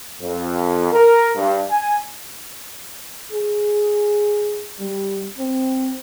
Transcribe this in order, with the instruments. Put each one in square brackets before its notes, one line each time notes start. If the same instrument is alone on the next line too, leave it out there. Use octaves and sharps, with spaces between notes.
[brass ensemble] F2
A#4
G2
G#5
G#4
G3
C4